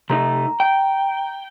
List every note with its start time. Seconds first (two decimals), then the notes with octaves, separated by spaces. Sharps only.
0.10 C3 A3 D#4 A#5
0.60 G5